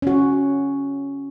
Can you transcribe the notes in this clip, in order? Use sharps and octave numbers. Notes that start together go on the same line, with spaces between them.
C#4 F#4